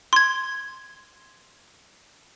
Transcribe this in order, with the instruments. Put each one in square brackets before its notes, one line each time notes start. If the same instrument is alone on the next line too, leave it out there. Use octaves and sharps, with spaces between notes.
[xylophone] C6 G#6